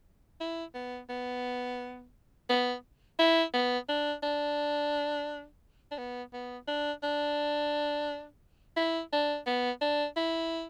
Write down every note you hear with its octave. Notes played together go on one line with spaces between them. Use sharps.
E4
B3
B3
B3
E4
B3
D4
D4
D4
B3
B3
D4
D4
E4
D4
B3
D4
E4